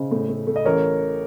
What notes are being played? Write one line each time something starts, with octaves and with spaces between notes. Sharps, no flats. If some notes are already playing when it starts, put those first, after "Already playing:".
Already playing: C#3 C5 D#5
A2
A3
A3
D#5
A1 A#4 C#5